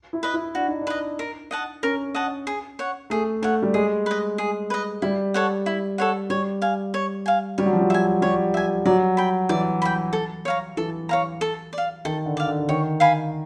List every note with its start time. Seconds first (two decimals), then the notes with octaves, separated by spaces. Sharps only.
0.13 E4
0.23 B4 D#5
0.34 E4
0.55 D4 F#4
0.68 D#4
0.81 D4
0.87 B4 D#5
1.19 A#4
1.51 D#5 F#5 A5
1.83 C#4 A#4
2.15 D#5 F#5 A5
2.47 G#4
2.79 C#5 F#5
3.10 A3 G#4
3.42 A3 C#5 F#5
3.62 G3
3.74 G#3 G#4
4.06 B4 D#5
4.38 G#4
4.70 B4 D#5
5.02 G3 E4
5.34 A4 C#5 F#5
5.66 E4
5.98 A4 C#5 F#5
6.30 G3 C#5
6.62 F5 G#5
6.94 C#5
7.26 F5 G#5
7.58 G3 C#5
7.66 F#3
7.73 F3
7.81 F#3
7.90 E5 G#5
8.22 G3 C#5
8.54 E5 G#5
8.85 F#3 D5
9.17 G5 B5
9.49 E3 D5
9.82 G5 B5
10.13 A4
10.45 C#5 F5 A#5
10.77 E3 A4
11.09 C#5 F5 A#5
11.41 A4
11.73 D5 F5
12.05 D#3 A4
12.26 D3
12.37 D5 F5
12.47 D3
12.59 D3
12.69 D#3 C#5
13.00 F5 G#5 B5